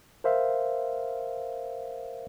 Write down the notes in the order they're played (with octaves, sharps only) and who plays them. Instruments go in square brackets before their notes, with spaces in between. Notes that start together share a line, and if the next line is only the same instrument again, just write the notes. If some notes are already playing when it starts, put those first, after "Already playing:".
[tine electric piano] A#4 C5 E5 F5